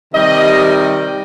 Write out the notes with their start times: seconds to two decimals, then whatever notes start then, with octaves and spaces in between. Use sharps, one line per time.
0.14 C3 D#3 G3 D#5